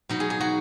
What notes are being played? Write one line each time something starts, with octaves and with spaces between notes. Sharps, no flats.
B2 F#3 D#4
G#4
G#4
F#4